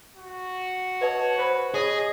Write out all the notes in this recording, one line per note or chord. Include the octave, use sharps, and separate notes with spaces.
F#4
B4 C#5 D#5 A5
B4 C5 B5
G#4 C#5 D#5